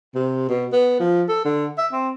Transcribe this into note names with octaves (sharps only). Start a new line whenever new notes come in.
C3
B2
B3
F3
A4
D3
E5
C4